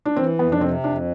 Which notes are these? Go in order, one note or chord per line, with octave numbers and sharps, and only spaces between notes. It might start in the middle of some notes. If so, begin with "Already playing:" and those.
D4
E3 C4
F2 B3
D4
C3 C4
F2 D4